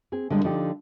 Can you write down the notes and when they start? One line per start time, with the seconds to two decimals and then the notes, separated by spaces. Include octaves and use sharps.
0.12 C4 G#4
0.30 D3 G3 G#3
0.44 D3 F3 D#4 G4